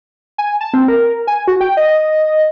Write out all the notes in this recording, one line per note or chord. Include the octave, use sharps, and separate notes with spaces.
G#5
A5
C4
A#4
G#5
F#4
G5
D#5